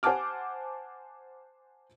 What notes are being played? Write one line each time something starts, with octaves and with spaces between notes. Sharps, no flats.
C5 F#5 G#5 A5 D6 F6